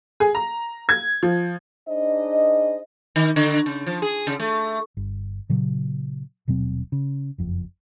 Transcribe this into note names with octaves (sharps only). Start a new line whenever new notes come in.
G#4
A#5
G#6
F3
D4 D#4 G#4 C5 D#5
D#3
D3
C#3
F3
G#4
C#3
A3
G1
A#2 C#3 F#3
D#1 B2 F#3 C4
C#3
F#1 F2